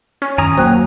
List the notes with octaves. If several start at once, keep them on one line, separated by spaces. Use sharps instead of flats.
C#4
F#2 D#3 G#5 A#5 D#6
D#1 F#3 A#3 C5 G5 F#6